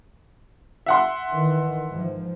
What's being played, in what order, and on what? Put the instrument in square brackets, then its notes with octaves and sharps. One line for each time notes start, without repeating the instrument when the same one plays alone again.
[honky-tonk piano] E5 F#5 C6
[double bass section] D#3 E3
G#2 F3